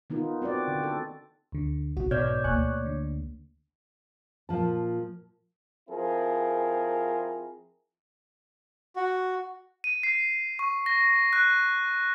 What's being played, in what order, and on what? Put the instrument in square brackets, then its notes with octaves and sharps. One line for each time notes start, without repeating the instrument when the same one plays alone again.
[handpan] D#3 B3 D#4 F4 A#4
C4 F#4 B4 D5
D3
A4
[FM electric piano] D2 D3
[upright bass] B1 G#2 [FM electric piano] F#4
[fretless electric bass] B2 [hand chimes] C#5 D5 [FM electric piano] F6 G6 G#6
[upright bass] D2 A#3 [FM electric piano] G#5 C#6 F#6
[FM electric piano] D3
[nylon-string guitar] A#2 F3 A5
[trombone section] F3 C4 E4 G#4 A#4
[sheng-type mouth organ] F#4
[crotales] D#7
C7
C#6
A#6
F#6